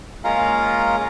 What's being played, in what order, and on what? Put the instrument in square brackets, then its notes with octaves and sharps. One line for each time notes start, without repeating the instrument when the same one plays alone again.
[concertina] G#3 A#3 C#4 F4 F5 A#5